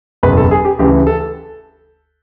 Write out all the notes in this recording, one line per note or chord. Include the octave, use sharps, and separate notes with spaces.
F#1 E2 B2 B4
A4
G#4
G4
D2 C#3 E3 G4
A4